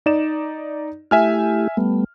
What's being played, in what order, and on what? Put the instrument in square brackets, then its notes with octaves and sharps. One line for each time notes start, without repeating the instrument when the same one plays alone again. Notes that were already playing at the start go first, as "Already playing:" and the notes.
[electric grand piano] D#4 D5 E7
[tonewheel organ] A3 E4 G4 [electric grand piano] E5 G#5 F6
[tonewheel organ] G3 A3 B3